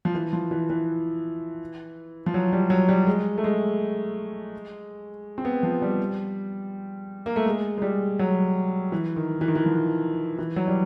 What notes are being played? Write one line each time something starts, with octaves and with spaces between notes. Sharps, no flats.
F3
E3
F3
E3
E3
F3
F#3
G3
F#3
G3
G#3
A3
G#3
C4
B3
F3
G3
A#3
A3
G#3
G#3
G3
F#3
E3
D#3
E3
D#3
E3
F3
E3
F#3
G3